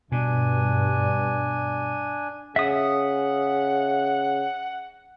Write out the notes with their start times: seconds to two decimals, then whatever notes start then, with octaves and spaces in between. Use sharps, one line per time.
0.12 G2 B2 D4 G#5
2.56 C#3 E5 F#5 D#6